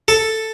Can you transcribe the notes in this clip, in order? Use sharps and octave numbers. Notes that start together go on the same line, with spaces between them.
A4